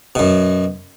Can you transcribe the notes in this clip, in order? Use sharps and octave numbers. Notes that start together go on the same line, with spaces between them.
F#2 B2